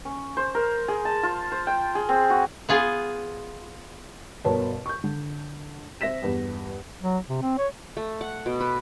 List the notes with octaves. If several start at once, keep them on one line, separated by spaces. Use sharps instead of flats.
C#4
C5
A#4
G#4
A5
F4
C5
G5
G#4
C4
F#4
B3 F4 G#4
G1 B2 A#4 B4 C#5 A5
C#6 G6
D3
C4 E5 A#6 B6 E7
E2 G2
F#3
C3
C4
C#5
A3
F#5
B2
B4